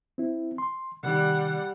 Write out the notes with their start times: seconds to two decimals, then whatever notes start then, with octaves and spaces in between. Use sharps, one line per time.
0.18 C4 E4
0.58 C6
1.03 C3 D#3 G3 F#5